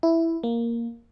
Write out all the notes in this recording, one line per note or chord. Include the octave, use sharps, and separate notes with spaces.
E4
A#3